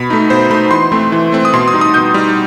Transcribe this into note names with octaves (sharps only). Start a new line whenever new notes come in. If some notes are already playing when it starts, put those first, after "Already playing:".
Already playing: B2 B5
A3 D#4
B2 C5
A3 D#4 B5
E3 C6
A3 C4
E3
A3 C4
D#6
B2 C6
D#6
G3 D#4
D#6
B2 G6
G3 D#4